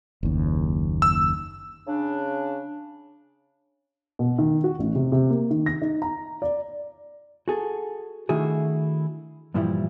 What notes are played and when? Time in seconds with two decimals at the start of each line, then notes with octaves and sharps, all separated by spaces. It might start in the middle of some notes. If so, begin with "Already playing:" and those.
0.23 F#1 D#2
1.02 E6
1.87 C#3 D4
4.19 B2
4.39 D#3
4.64 F#4
4.79 A1
4.95 C3
5.12 C3
5.30 A#3
5.51 D#3
5.66 A#6
5.82 D#4
6.02 A#5
6.42 D5
7.48 F#4 G#4 A4
8.29 D#3 A3 D4 E4 F#4 G#4
9.54 G2 A#2 E3 F3 G3 E4